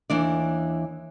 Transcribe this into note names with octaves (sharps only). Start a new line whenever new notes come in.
D#2 E3 D4 D5